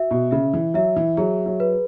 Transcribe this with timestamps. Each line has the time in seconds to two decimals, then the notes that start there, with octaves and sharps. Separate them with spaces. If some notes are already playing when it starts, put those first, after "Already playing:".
Already playing: F#4 E5
0.11 B2
0.31 C#3 E5
0.54 E3
0.74 F#3 E5
0.96 E3
1.17 F#3 G#4
1.46 F#3
1.60 B4